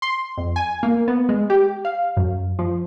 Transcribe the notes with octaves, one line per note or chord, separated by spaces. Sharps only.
C6
F2
G#5
A#3
B3
G#3
G4
F5
F#2
F3